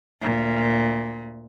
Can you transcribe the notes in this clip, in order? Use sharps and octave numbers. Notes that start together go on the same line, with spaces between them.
D2 A#2